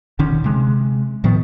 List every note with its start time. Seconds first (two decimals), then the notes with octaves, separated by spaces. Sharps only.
0.19 D#1 D3 D#3 C#4
0.44 C3 G#3
1.24 A2 D#3 F3 B3